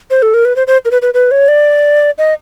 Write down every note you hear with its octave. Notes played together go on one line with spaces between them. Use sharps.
C5
A4
A#4
B4
C5
C5
A#4
B4
B4
B4
C#5
D5
D#5